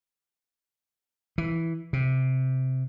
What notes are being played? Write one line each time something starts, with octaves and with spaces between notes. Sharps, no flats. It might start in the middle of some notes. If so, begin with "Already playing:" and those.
E3
C3